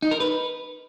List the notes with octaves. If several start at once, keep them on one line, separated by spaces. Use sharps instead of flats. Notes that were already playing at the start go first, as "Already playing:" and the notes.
D#4
A#4
B4